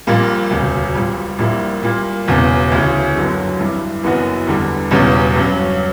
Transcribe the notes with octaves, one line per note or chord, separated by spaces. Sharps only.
A#1 A#2 G3 A#3
E1 D2 C#3
A#1 A#2 G3
A#1 A#2 G3 A#3 E4
A#2 G3 A#3
E1 E2 C#3
D2 C#3 E3
G1 F#2 D3 F#3
G2 E3 G3
F#1 F#2 E3 B3 F#4
E2 D3 G3
E1 E2 C#3 G3 C#4
G2 F#3 C#4